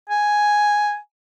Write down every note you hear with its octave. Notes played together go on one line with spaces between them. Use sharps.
G#5